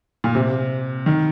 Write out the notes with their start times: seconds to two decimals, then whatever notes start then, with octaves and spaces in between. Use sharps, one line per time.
0.24 A#2
0.35 C3
1.06 D#3